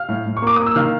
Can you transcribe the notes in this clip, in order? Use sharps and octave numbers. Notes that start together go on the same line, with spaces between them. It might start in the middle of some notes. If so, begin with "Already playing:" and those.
Already playing: F5 F6
A2
A2
C#6
A#3 D6
A#3 D#6
E6
D#3 F5 F6